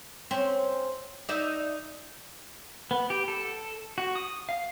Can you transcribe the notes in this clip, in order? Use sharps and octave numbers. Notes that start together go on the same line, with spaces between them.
C4 C#4
D#4 D5 E5
B3
G4
A4
F#4
D#6
F5